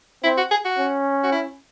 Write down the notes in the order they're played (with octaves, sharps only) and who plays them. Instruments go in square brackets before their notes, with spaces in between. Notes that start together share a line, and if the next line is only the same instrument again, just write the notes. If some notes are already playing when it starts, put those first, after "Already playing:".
[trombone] C4 [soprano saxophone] E4
[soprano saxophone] F#4
G#4
F#4
[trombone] C#4
[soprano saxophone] F#4
E4